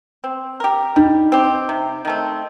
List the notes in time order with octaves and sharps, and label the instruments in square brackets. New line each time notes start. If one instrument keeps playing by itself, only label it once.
[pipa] C4
G4 A#4
[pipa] G3 [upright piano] D#4
[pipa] C4 G4
C3
D#3 A3 C4